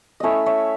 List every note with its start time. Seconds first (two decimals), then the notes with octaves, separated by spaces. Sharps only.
0.20 A3 C#4 E4 C#5 D#5 E5
0.46 C#5 E5